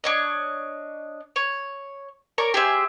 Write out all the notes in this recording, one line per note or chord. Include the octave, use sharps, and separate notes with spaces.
D4 C#5 D#5
C#5
A#4 C#5 D5 C#6
G4 G#4 C5 E5